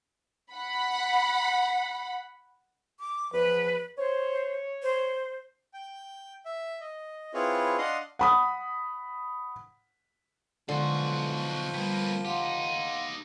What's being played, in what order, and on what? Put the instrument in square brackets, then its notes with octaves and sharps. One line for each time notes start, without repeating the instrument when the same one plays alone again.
[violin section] F#5 B5
[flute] D6
[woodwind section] E2 F3 [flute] B4
[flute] C5 [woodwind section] C#5
[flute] C5
[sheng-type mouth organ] G5
E5
D#5
C4 E4 F4 G#4 B4 C#5
D4 D#5 F5 F#5 C6 D#6
[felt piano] F#5 B5 D#6
[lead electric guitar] B1 F#4 [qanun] D3 [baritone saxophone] F3 [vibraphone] G#3 A4 C6
[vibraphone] G3 [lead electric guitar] A#3 B3
[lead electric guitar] D#4 G4 [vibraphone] F5 F#5 C6